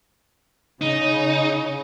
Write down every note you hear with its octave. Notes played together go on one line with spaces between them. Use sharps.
C#3 D#4